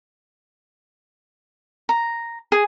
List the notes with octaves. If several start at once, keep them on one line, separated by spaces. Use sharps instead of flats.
A#5
G#4